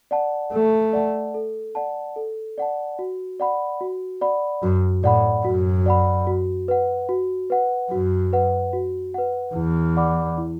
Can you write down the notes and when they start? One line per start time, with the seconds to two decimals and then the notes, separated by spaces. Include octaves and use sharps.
0.11 D5 F#5 A5
0.52 A3 A4
0.93 D5 F#5 A5
1.34 A4
1.75 D5 F#5 A5
2.16 A4
2.58 D5 F#5 A5
2.99 F#4
3.40 D5 F#5 B5
3.81 F#4
4.21 D5 F#5 B5
4.63 F#2 F#4
5.03 A2 D5 F#5 B5
5.45 F#2 F#4
5.86 D5 F#5 B5
6.27 F#4
6.68 B4 F#5
7.09 F#4
7.50 B4 F#5
7.91 F#2 F#4
8.33 B4 F#5
8.73 F#4
9.14 B4 F#5
9.55 E2 E4
9.97 D5 F#5 B5 D6
10.38 E4